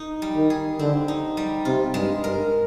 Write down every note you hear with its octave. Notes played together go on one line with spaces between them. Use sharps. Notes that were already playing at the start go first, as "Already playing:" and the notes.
Already playing: D#4
G3
D#3
G#4
D3 C4
D#4
G3
C3 F4
G2 G#3
G2 A#4